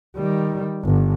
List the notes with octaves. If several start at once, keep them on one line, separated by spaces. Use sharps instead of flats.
D#3 G3
G1 D3